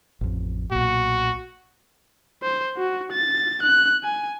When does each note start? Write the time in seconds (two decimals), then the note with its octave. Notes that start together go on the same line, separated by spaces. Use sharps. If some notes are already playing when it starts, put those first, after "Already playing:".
0.21 A1 F2
0.71 B1 A#2 F#4
2.42 C5
2.77 F#4
3.12 A6
3.63 F#6
4.03 G#5